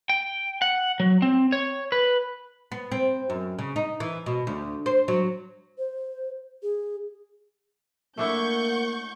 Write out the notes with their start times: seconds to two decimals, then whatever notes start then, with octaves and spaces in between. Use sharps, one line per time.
0.10 G5
0.62 F#5
1.00 F#3
1.22 C4
1.52 C#5
1.92 B4
2.72 B3
2.92 C4
3.30 F#2
3.59 C#3
3.76 D#4
4.00 E3
4.26 B2
4.47 D2
4.86 C5
5.08 F#3
5.78 C5
6.63 G#4
8.17 A3 A#3 D4 E4 F#5 C#6 G6